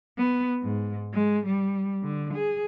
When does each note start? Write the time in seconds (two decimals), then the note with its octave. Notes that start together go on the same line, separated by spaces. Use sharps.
0.18 B3
0.63 G#2
1.14 G#3
1.46 G3
2.03 D3
2.33 G#4